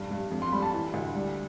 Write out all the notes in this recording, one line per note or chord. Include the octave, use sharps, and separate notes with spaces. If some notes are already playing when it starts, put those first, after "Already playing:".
Already playing: F1 G2
G2
F2
C6
G3 B5
A5
E3
D2
G3